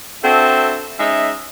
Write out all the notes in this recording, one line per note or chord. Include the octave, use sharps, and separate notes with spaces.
C4 D4 F#4 A4 E5
G#3 C#4 D#4 E5